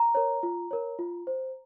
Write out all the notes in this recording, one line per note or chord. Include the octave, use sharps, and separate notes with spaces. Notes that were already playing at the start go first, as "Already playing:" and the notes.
Already playing: A#5
A#4 C#5
F4
A#4 C#5
F4
C5